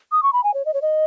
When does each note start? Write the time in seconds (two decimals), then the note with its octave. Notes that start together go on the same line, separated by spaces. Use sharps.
0.12 D#6
0.23 C#6
0.33 B5
0.44 G#5
0.54 C#5
0.66 D#5
0.74 C#5
0.82 D#5